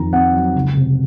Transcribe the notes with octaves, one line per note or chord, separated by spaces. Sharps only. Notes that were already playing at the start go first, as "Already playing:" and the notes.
Already playing: F2 D#3 A#5
C4 F#5
F#3
C#2
C3